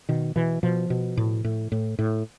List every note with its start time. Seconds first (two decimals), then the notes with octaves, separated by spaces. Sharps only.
0.09 B2 D#3
0.36 B2 E3
0.63 B2 F3
0.90 B2
1.17 A2
1.44 A2
1.72 A2
1.99 A2